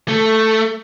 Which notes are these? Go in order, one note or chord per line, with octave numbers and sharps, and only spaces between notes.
A3